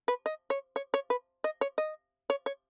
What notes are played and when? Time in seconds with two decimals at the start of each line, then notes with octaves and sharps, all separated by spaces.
0.08 B4
0.26 D#5
0.50 C#5
0.76 C#5
0.94 C#5
1.10 B4
1.44 D#5
1.61 C#5
1.78 D#5
2.30 C#5
2.46 C#5